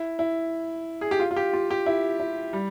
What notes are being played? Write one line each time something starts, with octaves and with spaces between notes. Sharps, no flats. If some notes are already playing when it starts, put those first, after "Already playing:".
Already playing: E4
E4
G#4
G4
F4
F4
G4
F4
G4
E4
E4
G3